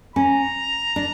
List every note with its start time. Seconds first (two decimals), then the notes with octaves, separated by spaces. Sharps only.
0.16 C#4 A#5
0.96 D4